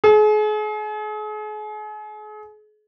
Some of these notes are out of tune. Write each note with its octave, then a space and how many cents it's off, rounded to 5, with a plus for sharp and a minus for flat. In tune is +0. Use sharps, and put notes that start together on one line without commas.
G#4 +40